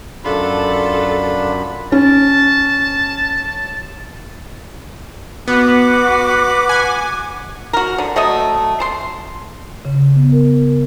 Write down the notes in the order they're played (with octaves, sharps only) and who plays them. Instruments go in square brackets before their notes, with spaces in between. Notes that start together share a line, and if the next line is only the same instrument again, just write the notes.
[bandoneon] F#2 B5 [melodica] D4 F4 [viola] A4
[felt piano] C#4 [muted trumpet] A5
[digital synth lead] B3 [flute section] F#4 D6 [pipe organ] B4 F#5
[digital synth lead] G#5
[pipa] F#4 A#4
D3
F#3 A3 A4 D#5
A5 C6
[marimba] C#3
B3
A#4